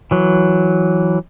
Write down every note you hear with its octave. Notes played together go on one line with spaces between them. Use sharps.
E3 F#3